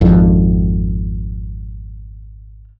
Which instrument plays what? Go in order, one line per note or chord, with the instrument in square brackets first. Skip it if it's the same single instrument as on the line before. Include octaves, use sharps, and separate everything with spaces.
[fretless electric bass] G#1 F2